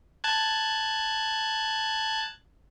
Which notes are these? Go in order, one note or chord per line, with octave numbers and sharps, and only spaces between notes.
A5 F#6 G#6